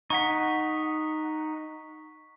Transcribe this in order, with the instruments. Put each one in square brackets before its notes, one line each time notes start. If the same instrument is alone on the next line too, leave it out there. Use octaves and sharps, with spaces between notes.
[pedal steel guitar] D#4 F#5 [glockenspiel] C#6 B6